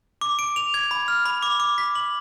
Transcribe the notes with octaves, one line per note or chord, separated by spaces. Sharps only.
D6
D7
F7
G#6
B5
F6
B5
D6
D6
B6
F#7